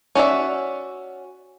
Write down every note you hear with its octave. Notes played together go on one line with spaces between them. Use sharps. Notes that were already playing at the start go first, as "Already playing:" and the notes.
C#4 F#4 D5 E5